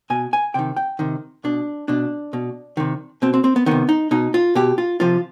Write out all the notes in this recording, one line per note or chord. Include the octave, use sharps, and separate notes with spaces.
B2 G#5
G#5
C3 D#3 G5
G5
C3 D#3
B2 D4
B2 D4
B2
C3 D#3
B2 C4
C4
C4
B3
C3 D#3 B3
D#4
B2 D#4
F4
B2 G4
F4
C3 F3 F4